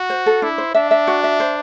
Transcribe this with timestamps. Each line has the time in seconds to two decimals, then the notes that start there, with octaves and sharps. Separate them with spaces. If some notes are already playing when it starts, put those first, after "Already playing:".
Already playing: F#4
0.10 C5
0.26 A4
0.42 D4 E4
0.58 C5
0.74 D4 E5
0.91 E5
1.07 F#4
1.24 E5
1.40 C5